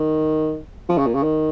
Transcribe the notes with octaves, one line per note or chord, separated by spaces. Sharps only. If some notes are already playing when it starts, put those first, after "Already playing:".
Already playing: D#3
F3
C#3
A#2
C#3
D#3